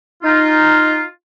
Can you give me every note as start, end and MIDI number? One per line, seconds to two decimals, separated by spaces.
0.23 1.02 63
0.23 1.02 65